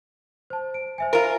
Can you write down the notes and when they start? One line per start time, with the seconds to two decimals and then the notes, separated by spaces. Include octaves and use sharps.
0.50 C5 A5
0.74 D7
0.98 C5 E5 G#5
1.13 F4 A#4